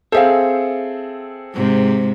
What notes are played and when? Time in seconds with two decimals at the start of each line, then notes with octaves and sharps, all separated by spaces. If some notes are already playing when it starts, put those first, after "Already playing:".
0.12 C4 G#4 A4 C5 E5 F5
1.54 G#2 C3 G#3